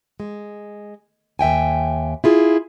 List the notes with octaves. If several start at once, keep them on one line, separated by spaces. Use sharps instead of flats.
G#3
D#2 E5 G5 G#5
E4 F4 G#4